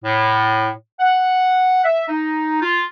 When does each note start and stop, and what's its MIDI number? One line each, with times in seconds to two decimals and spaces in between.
0.04 0.70 45
1.00 1.82 78
1.85 2.06 76
2.08 2.58 63
2.62 2.84 65